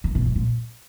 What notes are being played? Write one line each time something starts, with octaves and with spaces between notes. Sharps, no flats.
D#3
B2
F#2
A#2